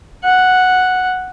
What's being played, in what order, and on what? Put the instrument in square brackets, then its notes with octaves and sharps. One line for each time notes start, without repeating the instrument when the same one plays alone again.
[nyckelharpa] F#5